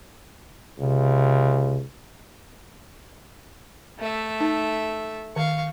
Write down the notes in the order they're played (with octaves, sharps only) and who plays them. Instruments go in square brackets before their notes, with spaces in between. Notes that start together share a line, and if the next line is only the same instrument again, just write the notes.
[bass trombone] C#2 [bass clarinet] C3
[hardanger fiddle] A3 E5
[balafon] D#4
[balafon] D#3 [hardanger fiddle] F5 C#6